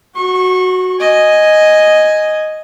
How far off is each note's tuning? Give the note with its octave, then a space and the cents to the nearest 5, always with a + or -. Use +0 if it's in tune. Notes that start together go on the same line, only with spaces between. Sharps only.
F#4 +0 C#6 -30
D#5 +0 G#5 +0